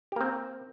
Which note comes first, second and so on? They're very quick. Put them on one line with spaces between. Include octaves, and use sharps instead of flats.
G4 A#3 C4